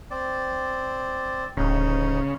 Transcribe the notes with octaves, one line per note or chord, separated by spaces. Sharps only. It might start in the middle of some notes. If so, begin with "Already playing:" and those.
C4 D5
D1 C#3 D#4